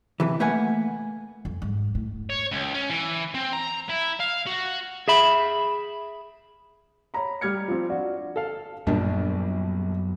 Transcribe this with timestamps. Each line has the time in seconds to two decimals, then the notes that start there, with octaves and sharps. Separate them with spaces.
0.20 C3 E3
0.40 A3 A#3 B4 F#5 G#5
1.45 F2
1.62 G#2
1.95 A2
2.30 C#5
2.51 C#2
2.74 C#4
2.90 E3
3.35 C4
3.53 A#5
3.89 E4
4.20 F5
4.47 F#4
5.08 G#4 E5 B5
7.14 C#5 A#5 B5
7.41 G3 G4 F6 G#6 C#7
7.68 F3 C4
7.89 D4 F#4
8.36 A4 F5
8.87 A#1 F#2 G3 B3 D4